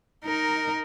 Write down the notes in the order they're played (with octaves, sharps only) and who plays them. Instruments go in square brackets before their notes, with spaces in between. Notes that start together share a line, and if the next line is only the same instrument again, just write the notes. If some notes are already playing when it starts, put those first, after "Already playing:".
[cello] D#4 A#4